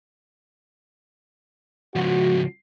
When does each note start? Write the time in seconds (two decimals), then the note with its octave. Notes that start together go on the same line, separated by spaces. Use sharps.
1.95 C#2 F3 F#4